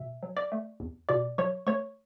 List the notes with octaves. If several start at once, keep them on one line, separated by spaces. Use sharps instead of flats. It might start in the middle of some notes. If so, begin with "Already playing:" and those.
Already playing: B2 E5
F#3
D5 D6
A3
E2
B2 D5 D6
F#3 C#5 C#6
A3 C#5 C#6